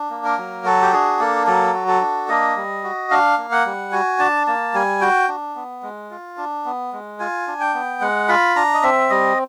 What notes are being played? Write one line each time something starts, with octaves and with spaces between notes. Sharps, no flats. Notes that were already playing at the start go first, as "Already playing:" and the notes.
Already playing: D4
A#3
A#4
F#3
F#4 A4
G4
D4 G#4
A#3 A4
F#3 A4
F#4
A4
D4
A#3 D#5
G3
F#4
D4 F5
A#3
F#5
G3
F#4 G#5
D4 A5
A#3 A5
G3 G#5
F#4 G5
D4
B3
G#3
F4
D4
B3
G#3
F4 G#5
D4
G5
B3
G#3 F#5
F4 B5
D4 A#5
D#5
C4 E5
G3 D#5